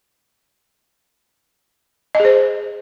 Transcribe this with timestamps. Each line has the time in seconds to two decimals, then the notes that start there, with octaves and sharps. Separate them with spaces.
2.15 D#5
2.20 G#4
2.25 C5